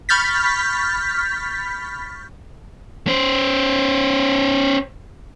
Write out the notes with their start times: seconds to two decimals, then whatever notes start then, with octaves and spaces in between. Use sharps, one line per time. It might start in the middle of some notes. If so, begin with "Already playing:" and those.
0.09 B5 C#6 F6 G6 A6 B6
3.07 C#4 C5